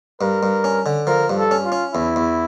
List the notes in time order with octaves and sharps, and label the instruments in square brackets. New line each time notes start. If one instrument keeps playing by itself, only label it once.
[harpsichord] G2 [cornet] A#4
[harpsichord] G2
C#4
D3
[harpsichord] F3 [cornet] A#4
[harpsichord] G2
[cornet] A4
[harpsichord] C#4
[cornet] F4
[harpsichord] C#4
[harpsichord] E2 [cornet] E4
[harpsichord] E2